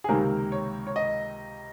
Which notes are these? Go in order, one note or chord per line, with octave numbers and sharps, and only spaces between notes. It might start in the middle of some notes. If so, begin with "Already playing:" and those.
G#4
C#2 C3 D#3 A#3 A#4
C#5
C#5
D#5